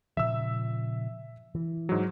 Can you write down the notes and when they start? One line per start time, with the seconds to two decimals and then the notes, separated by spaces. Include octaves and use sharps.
0.17 A#2 C#3 F3 E5 E6
1.55 E3
1.89 G#2 F#3